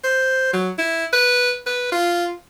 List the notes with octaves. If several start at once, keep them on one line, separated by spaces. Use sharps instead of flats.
C5
F#3
E4
B4
B4
F4